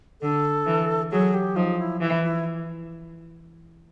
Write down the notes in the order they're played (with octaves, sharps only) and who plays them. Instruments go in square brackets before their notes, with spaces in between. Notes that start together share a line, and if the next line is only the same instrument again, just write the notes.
[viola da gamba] D3 [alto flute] A4
[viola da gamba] E3
[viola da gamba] F#3 [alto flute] G#4
[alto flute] G4
[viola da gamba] F3 [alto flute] D#4
[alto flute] E4
[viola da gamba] E3 [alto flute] E4
[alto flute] E4